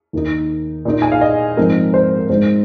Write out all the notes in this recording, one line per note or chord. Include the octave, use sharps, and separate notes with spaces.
D#2 D#3 A#3 D#4
A#2 A#3 D#4
G#5
F5
D#5
G#2 F3 C4 D#4 A#4
C5
A#4
G#2 G#3 D#4 C5